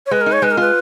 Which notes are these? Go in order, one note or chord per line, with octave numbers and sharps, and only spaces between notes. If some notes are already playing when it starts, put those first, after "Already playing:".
C#5
G#3 B4
A#4
D#4
C#5
G#3 B4
A#4
F4 B4